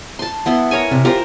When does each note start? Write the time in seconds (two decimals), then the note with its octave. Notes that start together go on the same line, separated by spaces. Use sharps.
0.19 A5 C6
0.46 B3 E4 C6
0.71 A#4 C#5 G#5
0.91 C3
1.05 F4 G4 A#4 C5